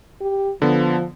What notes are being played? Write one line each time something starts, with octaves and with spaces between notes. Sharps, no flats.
G4
D3 F3 B3